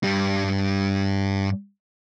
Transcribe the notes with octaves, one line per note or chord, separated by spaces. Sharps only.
G2 G3